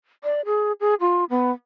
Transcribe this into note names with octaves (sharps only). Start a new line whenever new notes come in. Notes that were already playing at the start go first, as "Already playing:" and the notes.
D5
G#4
G#4
F4
B3